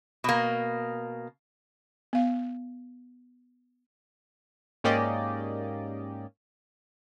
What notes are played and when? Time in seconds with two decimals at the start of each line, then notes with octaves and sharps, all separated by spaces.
0.24 B2 A#3
2.13 B3 F5
4.84 G#2 A#3 C#4 G4 D5 D#5